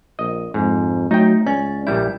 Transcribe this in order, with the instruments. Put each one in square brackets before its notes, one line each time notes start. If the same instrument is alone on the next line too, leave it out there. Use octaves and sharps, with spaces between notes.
[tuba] A#1 [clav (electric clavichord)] D#5
[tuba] F2 [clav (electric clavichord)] G#2
[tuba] F#3 [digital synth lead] A3 [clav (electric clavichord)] D#4 G5
[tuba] C#2 [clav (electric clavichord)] C#4 [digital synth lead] D5
[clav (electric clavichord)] A#1 G3 E4 [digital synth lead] G6